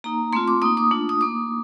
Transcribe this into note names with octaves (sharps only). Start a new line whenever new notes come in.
A#3 D#4 A#5
A3 C4 F4 C6
D6
A#3 D#4 D#6
D6
A3 D4 F4
D#6
A#3 D#4 D6